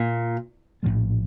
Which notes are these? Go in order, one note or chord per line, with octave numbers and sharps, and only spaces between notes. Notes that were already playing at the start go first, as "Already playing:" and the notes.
Already playing: A#2
A#1 A2 F3 A3